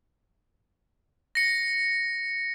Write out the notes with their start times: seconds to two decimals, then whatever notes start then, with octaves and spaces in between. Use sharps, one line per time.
1.35 A#6 C#7